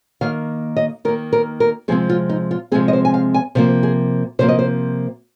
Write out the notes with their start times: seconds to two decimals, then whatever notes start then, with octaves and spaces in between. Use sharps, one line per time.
0.21 D#3 A#3 F5
0.77 D#5
1.05 D#3 A#4
1.08 A#3
1.33 A#4
1.60 A#4
1.88 C3 F3 G#3 C4 G#4
2.09 F4
2.30 D#4
2.51 F4
2.72 C3 F3 G#3 C4 G#4
2.88 D#5
2.93 C5
3.05 G#5
3.14 F5
3.34 G#5
3.55 C3 F3 A#3 C5
3.83 G#4
4.39 C3 F3 A#3 C5
4.48 D#5
4.59 C5